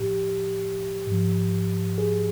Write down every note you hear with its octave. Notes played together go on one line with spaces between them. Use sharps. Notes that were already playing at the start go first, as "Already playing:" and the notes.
Already playing: A2 F3 G4
G#2
F3
G#4